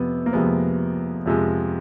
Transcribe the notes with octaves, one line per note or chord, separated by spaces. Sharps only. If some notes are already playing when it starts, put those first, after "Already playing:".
Already playing: F2 C3 F3 B3
A#3
F2 C3 F3 G#3 B3
F2 C3 F3 G#3